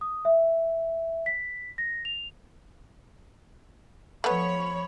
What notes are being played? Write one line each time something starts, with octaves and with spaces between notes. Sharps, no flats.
D#6
E5
B6
A#6
F7
F3 A3 B3 C#5 B5